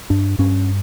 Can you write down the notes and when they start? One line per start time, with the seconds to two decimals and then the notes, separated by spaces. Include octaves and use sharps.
0.10 G2 D4
0.39 G2 C#4